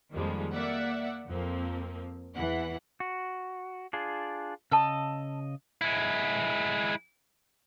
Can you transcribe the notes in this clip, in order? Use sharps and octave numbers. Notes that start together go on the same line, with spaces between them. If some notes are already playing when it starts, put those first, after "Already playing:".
F2 D#3 F3 G3 G#3 A#3
A#3 D5 E5 F#5
F2 F3 A#3 C4
E2 E3 F#5
F#4
D4 F4 G#4
C#3 D#5 A5 E6
G#3 E4